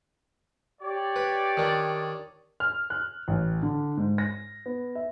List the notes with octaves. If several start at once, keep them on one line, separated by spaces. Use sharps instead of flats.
G4 C#5 D5
B4
D#3 D4
F6
F#6
A1
D3
G#2
A#6
B3
E5